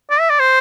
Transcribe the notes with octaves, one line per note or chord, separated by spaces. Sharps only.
D5
E5
D5
C5